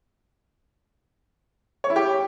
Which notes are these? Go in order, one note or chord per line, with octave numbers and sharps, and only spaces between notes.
C#5
E4
G4